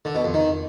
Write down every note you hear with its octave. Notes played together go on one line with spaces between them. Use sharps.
D3
B2
F2
D#3